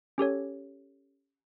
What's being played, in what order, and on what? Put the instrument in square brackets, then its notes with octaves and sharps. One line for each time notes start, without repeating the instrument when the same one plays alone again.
[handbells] C#4 G4 A4 C#5